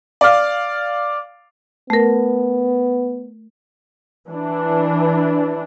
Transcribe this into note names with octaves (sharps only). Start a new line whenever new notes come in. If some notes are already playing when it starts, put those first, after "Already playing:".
D5 F5
A3 B3 A#4
E3 D4